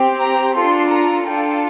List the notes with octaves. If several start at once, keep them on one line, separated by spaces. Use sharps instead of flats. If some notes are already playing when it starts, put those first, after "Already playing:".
Already playing: C4 G4
A#5
D4 F4 A4 C6
A#5
D4 F4 A4 G5